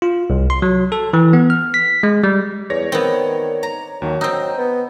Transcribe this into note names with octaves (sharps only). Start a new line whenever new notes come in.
F4
C2
C6
F#3
A4
E3
B3
F6
B6
G#3
G3
E2 C#5 D5 A#6
D#3 B3 C4
A#5
D#2 D#3 F#3
C4 D#4 D#6 E6 G6
B3